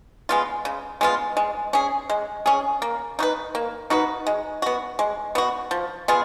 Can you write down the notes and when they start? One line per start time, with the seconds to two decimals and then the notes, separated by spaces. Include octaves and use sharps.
0.29 G#3 B3 F4
0.65 C#3
1.01 G#3 B3 F4
1.37 G#3
1.73 C#4 G#4
2.10 G#3
2.46 C#4 G#4
2.82 A#3
3.19 D#4 F#4 B4
3.55 A#3
3.90 D#4 F#4 B4
4.27 G#3
4.62 B3 F#4
4.99 G#3
5.35 B3 F#4
5.71 F3
6.08 B3 F4 G#4